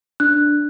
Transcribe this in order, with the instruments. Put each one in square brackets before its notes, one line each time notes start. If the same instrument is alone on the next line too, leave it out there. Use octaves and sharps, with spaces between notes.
[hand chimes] D4 F#6